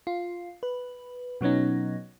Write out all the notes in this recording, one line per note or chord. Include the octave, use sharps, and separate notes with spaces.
F4
B4
B2 F#3 B3 C#4 D#4